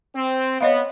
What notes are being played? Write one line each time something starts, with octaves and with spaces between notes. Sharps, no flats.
C4
B3 C#5 D#5 F5